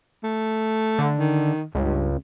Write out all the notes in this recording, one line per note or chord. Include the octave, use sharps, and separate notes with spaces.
A3
D3
D#3
C#2 G2